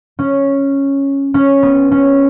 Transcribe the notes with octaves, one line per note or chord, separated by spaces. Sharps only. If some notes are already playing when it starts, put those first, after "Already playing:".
C#4
C#4
B3
C#4